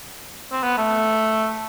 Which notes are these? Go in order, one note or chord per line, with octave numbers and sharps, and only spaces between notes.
C4
B3
A3